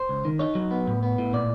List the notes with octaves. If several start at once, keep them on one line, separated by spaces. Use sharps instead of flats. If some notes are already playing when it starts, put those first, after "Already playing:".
Already playing: C5
C#2
D#3
D#4 C#5
F#3
B3
A2
B3
A2
A#2 D5